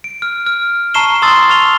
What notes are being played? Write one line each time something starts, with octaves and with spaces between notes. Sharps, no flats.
D7
F6
F6
A5 A#5 C#6 C7 E7 G7
A5 C6 D#6 E6 A6
A5 C#6 F6 F7 G7